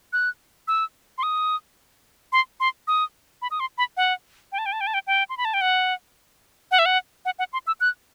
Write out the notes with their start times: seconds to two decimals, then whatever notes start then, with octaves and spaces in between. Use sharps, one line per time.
0.13 F#6
0.68 E6
1.18 C6
1.23 D#6
2.32 C6
2.60 C6
2.88 D#6
3.42 B5
3.51 D#6
3.60 C6
3.78 B5
3.97 F#5
4.52 G5
4.58 A5
4.66 G5
4.73 A5
4.81 G5
4.87 A5
4.94 G5
5.07 G5
5.29 C6
5.37 B5
5.45 A5
5.54 G5
5.61 F#5
6.71 F#5
6.79 E5
6.86 F#5
7.25 F#5
7.39 F#5
7.53 C6
7.67 E6
7.81 F#6